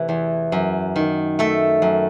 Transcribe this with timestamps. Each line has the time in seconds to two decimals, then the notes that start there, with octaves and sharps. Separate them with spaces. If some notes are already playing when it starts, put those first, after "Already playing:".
Already playing: C3 E3 A3
0.09 E2
0.52 F#2
0.96 D#3
1.39 A3 A4
1.82 F#2